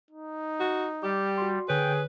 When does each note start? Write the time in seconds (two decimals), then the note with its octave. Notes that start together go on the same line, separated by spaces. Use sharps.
0.11 D#4
0.60 F#4
1.03 G3 G4 D6
1.38 F#4 C6
1.69 D3 G#4 B4 C#5 G5